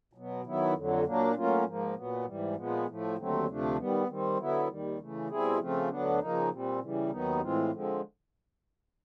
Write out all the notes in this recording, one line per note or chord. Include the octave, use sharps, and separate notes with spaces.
B2 F#3 B3
D#3 F#3 B3 E4
F2 D3 F#3
A#2 F#3 A#3 D4
A2 F#3 A#3 C#4 F4
G#2 F3 A#3
A#2 F#3 B3
G#2 E3 G3
A#2 F3 G#3 B3
A2 F3 A3
D#2 D3 F#3 A3 C4
D2 C3 F3 A3 D4
D#3 G3 B3
D#3 G3 C4
D3 F#3 B3 E4
D#2 D#3 G3
C#3 E3 A3
B2 G3 C4 E4 G#4
C#3 F3 A3 C4 F4
D2 D3 F#3 B3 D4
C#3 F3 A#3 D#4
A#2 G3 C4
C#3 E3 G3
D#2 D#3 F#3 B3 D#4
A2 E3 G#3 C4 F4
D3 F3 G#3 C4